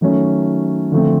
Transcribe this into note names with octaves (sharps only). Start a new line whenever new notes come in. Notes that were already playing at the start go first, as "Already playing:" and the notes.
D#3 F#3 A3 C#4
D3 F3 A3 C4